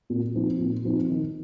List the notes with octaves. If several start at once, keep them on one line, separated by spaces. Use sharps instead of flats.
A#2
F3 C4 D#4
A#2
F3 C4 D#4
D#3